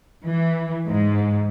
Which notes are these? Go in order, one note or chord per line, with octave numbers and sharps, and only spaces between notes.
E3
G#2